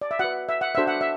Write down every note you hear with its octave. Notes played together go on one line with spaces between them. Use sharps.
D5
E5
F#4 B4 F#5
E5
F#5
D4 F#4 A4 C5 E5
F#5
E5